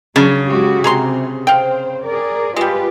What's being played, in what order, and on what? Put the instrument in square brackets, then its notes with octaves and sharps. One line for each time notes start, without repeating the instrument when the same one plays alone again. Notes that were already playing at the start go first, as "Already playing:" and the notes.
[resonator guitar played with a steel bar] C#3 [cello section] F#3 [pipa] D4
[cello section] G#3 F#4 G4
[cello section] C3 [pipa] G#4 A#5 C6
[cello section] C5 [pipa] F5 G5
[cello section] G#4 A#4 D5
[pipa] G3 G#3 [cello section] F4 G4 B4